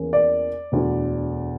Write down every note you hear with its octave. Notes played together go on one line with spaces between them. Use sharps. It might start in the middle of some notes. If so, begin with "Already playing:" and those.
Already playing: E2 E3 A#3 C#4
D5
E1 D2 D3